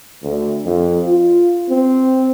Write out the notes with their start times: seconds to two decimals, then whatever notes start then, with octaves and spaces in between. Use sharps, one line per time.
0.23 D2
0.66 F2
1.07 F4
1.70 C4